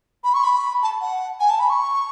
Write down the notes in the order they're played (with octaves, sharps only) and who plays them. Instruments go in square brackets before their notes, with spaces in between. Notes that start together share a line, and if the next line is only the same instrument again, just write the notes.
[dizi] B5
C#6
B5
A5
F#5
G#5
A5
B5
C#6